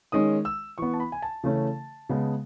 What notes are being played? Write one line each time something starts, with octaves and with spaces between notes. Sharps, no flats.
D#3 G#3 C#4 D#6
E6
E3 B3 C#6
A5
B5
G#5
A5
C#3 E3 A3 C#4
C#3 G#3 B3